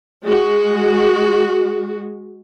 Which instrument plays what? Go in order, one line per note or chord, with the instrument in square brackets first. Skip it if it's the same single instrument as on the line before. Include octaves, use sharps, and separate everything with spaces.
[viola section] G#3 F#4